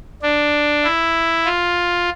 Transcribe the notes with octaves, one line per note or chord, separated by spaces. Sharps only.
D4
E4
F4